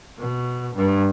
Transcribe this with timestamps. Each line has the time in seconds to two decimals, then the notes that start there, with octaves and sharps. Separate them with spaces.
0.18 B2
0.75 G2